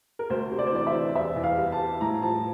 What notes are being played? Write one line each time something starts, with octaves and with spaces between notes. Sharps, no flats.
A#4
D2 C5
C3
D5
C5
E3 D5
E5
E3
E2 E5
E2
F5
G3
A5
G3
A2 A#5
F3 A5